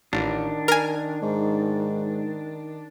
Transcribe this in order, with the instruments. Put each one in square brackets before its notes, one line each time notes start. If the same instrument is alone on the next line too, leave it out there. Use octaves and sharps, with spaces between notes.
[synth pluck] A1 [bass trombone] D#3 [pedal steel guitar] D4
[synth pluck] A#4 G#5
[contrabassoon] G#2